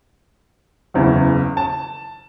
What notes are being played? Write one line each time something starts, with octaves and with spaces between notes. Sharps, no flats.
F#1 E2 C#3
A5